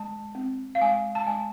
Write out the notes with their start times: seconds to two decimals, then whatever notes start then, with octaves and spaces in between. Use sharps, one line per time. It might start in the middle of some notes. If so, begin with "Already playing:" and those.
Already playing: G#3 A5
0.35 C4
0.75 F5
0.81 G#3 G#5
1.15 A5
1.27 G#3 G#5